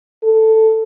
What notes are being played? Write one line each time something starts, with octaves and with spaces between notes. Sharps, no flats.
A4